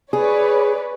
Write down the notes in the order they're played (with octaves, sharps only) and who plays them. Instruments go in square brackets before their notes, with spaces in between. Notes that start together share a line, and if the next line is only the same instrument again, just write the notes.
[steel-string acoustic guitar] G#4 [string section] B4 C#5 D5